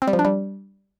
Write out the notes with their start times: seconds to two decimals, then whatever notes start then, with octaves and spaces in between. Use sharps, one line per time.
0.02 C4
0.08 G3
0.13 F3
0.19 D4
0.25 G3